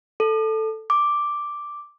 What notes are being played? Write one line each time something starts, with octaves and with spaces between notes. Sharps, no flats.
A4
D6